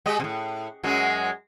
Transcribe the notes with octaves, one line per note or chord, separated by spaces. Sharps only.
G#3 G4 D#5
A2 C3
F#2 F#3 G#3